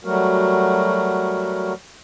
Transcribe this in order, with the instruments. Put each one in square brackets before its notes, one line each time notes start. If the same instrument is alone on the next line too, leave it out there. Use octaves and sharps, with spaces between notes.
[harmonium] F#3 G3 A3 F#4 A#4